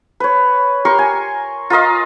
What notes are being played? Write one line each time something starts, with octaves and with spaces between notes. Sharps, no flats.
B4 C#5
G4 A#4 C6 C#6
G#5
F4 A#4 D#5 F5